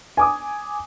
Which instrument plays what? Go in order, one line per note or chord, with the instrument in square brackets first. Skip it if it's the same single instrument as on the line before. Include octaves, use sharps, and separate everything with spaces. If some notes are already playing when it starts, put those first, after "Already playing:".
[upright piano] G#5 D6 D#6